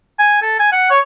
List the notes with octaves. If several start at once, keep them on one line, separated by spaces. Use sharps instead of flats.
G#5
A4
G#5
F#5
C#5